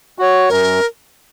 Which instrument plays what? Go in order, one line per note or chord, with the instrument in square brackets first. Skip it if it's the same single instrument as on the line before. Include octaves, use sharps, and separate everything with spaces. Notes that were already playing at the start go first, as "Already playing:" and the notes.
[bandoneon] F#4 C#5
[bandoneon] F#2 [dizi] A#4